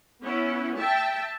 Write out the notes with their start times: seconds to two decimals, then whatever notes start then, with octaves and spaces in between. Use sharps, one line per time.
0.23 B3 C#4 E4
0.78 E5 G5 A5